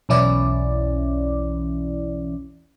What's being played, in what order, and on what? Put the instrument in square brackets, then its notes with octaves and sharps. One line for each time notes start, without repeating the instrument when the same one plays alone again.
[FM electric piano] B1 E2 E3 C#4 E4 D5